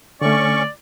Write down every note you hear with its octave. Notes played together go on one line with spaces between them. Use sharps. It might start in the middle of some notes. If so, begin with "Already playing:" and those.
D3 A3 C#4 D5 C#6